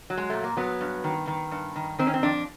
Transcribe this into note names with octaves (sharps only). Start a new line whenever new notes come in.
F#3
G#3
A#2 A3
A#3
F#3 B3
G2
D#3
D#3
G2
D#3
D#3 C4
C#4
C4
F2 D4